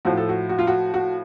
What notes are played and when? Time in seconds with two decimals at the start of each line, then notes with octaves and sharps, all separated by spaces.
0.05 A2 F3 F#4
0.17 A4
0.29 F#4
0.49 F#4
0.59 F4
0.67 F#4
0.94 F#4